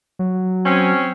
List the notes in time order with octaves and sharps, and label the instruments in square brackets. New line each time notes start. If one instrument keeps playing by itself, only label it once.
[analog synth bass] F#3
[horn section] C4 C#4